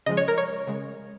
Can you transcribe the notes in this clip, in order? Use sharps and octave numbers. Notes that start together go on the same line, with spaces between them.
C#3 F3 G#3 D#5
C#5
A#4
C#5
C#3 G#3